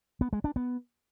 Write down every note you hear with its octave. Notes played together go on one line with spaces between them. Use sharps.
B3
G#3
D4
B3